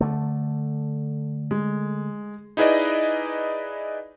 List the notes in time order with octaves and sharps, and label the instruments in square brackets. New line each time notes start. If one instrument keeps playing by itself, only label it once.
[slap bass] D3 A3
[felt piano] G#3
[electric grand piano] D#4 E4 G#4 B4 D5 D#5